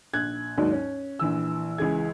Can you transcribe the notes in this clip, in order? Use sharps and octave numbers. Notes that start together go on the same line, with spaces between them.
A#1 F#6 G#6
D#2 G#2 F#3 D4
C#4
A#1 E3 E6
C#2 E3 G#4 G#6